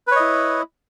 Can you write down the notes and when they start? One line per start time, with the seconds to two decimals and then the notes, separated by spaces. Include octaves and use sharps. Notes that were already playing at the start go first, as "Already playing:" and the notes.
0.07 B4
0.12 C#5
0.16 D#5
0.20 E4